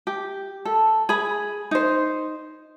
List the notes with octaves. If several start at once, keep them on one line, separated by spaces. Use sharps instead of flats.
G4
A4
G#4 B5
D#4 C5